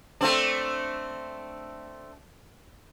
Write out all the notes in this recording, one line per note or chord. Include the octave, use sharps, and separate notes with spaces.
A3 C4 D4